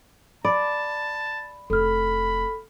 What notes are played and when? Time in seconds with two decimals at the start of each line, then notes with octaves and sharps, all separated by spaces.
0.45 D5 A5 B5
1.70 F1 A4 B5 F6